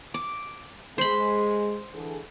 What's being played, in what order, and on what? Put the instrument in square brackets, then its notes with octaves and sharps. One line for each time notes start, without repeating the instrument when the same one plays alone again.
[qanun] D6
[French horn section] G#3 [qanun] C5 B5
[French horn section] D3 E3 G#4